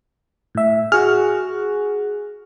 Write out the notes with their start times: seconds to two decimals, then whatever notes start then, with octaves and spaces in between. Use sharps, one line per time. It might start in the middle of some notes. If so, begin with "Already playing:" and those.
0.55 A2 E5
0.92 F#4 G#4 F6